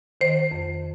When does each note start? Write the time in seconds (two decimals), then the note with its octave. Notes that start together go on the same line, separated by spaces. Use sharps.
0.21 D#3 C5
0.51 F2